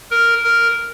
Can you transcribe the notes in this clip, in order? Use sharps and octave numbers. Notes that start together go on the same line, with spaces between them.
A#4
A#4